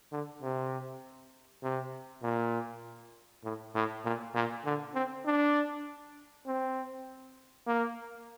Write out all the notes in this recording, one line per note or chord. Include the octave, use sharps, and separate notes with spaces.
D3
C3
C3
A#2
A2
A2
A#2
A#2
D3
C4
D4
C4
A#3